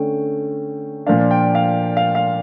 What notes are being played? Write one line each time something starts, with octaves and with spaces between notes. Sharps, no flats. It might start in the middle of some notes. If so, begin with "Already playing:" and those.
Already playing: D3 A3 C#4 G5
A#2 F3 A#3 D4 F5
G5
F5
F5
F5